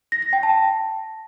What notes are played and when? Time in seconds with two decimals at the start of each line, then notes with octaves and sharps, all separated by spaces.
0.12 A#6
0.22 A#6
0.33 G5
0.43 A5